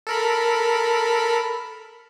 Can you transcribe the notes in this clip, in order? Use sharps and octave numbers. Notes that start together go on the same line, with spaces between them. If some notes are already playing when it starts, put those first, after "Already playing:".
A4 A#4 B5